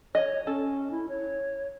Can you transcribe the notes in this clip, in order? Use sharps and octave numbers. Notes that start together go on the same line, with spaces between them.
C#5 D#5
C#4 A4
E4
C#5